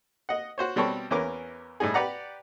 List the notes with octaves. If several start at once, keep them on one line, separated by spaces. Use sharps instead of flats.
D#5 F#5
F#4 C5 C#5
B2 G3 C4 A4 C#5 C#6
E2 E3 C#4 A#4 D6
A2 G3 D#4 G#4
G4 B4 D5 F#5 A#5